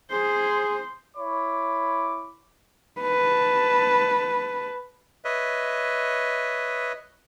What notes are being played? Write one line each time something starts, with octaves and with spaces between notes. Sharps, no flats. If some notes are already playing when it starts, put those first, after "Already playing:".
G#4 C5
E4 C#5 B5 D6
B4 A5
B4 C#5 D#5 E5